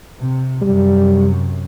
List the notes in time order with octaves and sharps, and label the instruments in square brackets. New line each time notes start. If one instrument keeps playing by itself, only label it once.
[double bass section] C3
[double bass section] F#2 C3 [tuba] G3